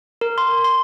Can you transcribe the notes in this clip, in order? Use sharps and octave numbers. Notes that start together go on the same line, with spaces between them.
A#4
C6
C6